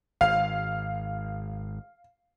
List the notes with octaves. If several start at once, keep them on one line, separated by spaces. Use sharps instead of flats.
G#1 F5